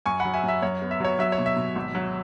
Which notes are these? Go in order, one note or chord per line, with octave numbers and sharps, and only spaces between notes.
F#2 G#5 C#6
F#5 B5
F#3
E5 G#5
F#2
E5
F#2 C#5
B3
E5
F#3 C#5
F#3 E5
C#5
B2
E5
B2
G#1
F#3